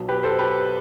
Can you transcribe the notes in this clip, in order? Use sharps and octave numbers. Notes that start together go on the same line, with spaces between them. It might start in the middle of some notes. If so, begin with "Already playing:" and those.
Already playing: B1 B2 F#3
G4 B4
A4 C5
G4 B4